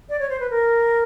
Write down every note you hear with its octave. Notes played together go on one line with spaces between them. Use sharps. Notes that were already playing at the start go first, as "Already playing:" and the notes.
D5
C#5
C5
B4
A#4